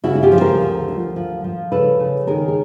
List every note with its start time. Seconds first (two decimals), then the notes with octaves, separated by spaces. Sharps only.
0.04 C#3 E4 F#4
0.15 F#4
0.23 F4 G4
0.32 F3
0.41 A#4 C5
0.60 D2
0.88 D2
1.16 F3
1.44 F3
1.72 C#3 A4 B4
2.00 C#3
2.27 D#3 G#4 A#4
2.48 A#4